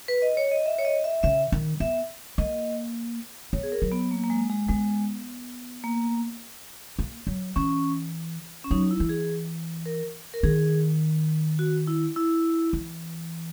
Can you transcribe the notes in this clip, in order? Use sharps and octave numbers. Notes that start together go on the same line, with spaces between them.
B4
D#5
C#5
D#5
E5
C#5
D#5
E5
C#3 E5
D#3
B3 E5
A#3 D#5
B3 C#5
G#4
A#4
F#3
B3
A#3
A#3
G#3
G#3
G#3 B3
A#3
A#3
F#3
E3 C#4
C#4
F#3 D#4
E4
E3
G#4
A#4
A#4
D#3 G#4
F#4
E4
E4
E3